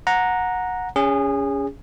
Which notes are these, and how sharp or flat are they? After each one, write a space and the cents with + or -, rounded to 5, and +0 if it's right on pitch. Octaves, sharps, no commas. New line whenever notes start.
F#5 -15 A#5 +0
C#4 +20 G#4 -25